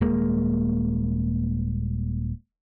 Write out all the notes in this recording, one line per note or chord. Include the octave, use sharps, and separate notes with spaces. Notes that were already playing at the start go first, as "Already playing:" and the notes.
D#1 G#3 A#3